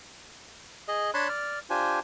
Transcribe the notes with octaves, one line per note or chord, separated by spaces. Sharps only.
G#4 D#5
D4 C#5 A5 B5 C6 F#6
D5 F6
D4 F4 G4 C5 G#5